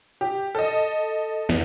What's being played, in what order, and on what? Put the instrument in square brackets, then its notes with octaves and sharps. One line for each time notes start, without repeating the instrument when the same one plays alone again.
[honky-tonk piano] G4
A4 D#5
[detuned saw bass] E2